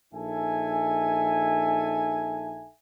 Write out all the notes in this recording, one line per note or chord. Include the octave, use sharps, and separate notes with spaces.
A#1 D#4 A4 E5 G#5